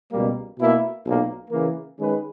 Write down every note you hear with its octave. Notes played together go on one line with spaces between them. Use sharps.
C#2 B2 G3 A#3
B2 A#3 E4
B1 A#2 A#3
C#3 E3 A#3
D#3 G#3 C#4 G#4 B4